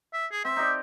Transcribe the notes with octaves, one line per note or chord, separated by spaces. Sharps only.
E5
G#4
C4 E5
D#4 G4 D5